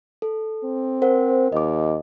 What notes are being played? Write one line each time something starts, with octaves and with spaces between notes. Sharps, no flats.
A4
C4
A#4 C5 F#5
D#2 D#5 D6